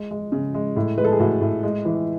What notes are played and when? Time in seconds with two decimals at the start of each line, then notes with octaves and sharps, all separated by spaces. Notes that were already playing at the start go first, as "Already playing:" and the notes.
Already playing: G#3
0.11 G#3
0.32 C#3
0.55 G#3
0.76 A2
0.98 G#3 B4
1.04 A4
1.12 G#4
1.20 A2 F#4
1.41 A2
1.63 G#3
1.85 E3